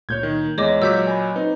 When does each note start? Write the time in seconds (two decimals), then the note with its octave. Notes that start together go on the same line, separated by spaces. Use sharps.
0.09 C#2 A#2 A#3 C#5 G6 G#6
0.23 D#3
0.58 E2 G#3 C#5 D#5 D6
0.82 A#2 F#3 E6 G6 B6
1.07 G#5 B5
1.36 C4 D#4 B4